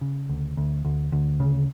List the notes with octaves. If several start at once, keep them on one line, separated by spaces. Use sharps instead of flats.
C#3
D2
D2
D2
D2
C#3